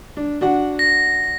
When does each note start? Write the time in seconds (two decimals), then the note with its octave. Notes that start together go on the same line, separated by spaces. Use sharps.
0.17 D4
0.41 D4 F#4 F#5
0.79 A#6